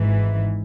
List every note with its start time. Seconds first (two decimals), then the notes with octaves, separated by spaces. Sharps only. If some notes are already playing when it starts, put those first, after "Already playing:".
Already playing: G#1 G#2 E3